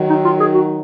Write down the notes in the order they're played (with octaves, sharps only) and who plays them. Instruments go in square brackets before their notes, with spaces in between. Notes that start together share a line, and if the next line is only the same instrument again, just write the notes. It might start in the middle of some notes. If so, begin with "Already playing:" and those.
Already playing: [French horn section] D#3 F#3
[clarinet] D#4
F4
G#4
F#4